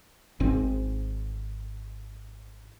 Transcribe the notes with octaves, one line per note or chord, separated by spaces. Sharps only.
G#1 G#2 C4